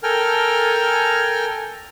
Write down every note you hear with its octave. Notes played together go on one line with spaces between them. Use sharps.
A4 A#4 G5 G#5 F6